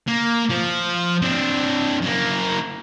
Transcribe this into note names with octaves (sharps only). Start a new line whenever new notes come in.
A#3
F3
C4 D4
F#2 A#3